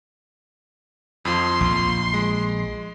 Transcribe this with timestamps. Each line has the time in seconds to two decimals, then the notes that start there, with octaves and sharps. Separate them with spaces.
1.25 F2 F3 C6
1.61 A#1
2.14 G#3